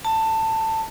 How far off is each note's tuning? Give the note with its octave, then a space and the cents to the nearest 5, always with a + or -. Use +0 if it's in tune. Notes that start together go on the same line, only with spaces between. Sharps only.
A5 +15